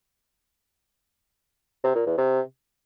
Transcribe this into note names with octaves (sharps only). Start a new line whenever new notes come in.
C3
A#2
E2
C3